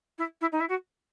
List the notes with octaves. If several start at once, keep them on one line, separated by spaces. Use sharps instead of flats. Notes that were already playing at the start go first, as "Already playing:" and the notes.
E4
E4
D#4
E4
F#4